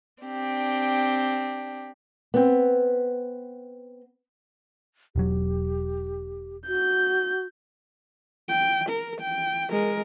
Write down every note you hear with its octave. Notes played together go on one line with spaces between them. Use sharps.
C4 D4 G4
B3 C4
E1 F#3 G4
F#4 G6
G5
A#4
G5
G#3 A#4